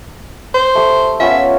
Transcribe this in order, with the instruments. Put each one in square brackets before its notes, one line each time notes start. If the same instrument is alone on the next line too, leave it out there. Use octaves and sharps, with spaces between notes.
[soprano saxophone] C5
[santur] A3 G4
[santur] B3 C#4 F4 [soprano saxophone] E5